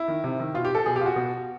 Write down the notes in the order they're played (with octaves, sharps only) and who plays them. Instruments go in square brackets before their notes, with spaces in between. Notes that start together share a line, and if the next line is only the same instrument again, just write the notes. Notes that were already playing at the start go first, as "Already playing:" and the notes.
Already playing: [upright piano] E4
D#3
C3
D#3
B2 F4
G4
A4
B2 G#4
G4
F4
F#4
B2